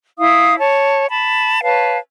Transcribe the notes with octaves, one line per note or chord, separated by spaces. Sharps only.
E4 F5 D#6
C#5 A5
A5 B5
B4 C#5 F5 A5